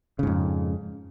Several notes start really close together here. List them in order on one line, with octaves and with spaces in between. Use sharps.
C#3 G#2 F2